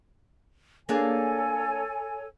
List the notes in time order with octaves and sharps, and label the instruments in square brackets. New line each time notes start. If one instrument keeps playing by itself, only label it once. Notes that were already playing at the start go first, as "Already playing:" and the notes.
[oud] A#3 D4 G#4 [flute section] A4 C#5 G#5